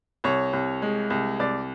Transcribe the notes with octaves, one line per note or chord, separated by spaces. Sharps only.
C2 C#5
C2
G#3
C2
C2 D5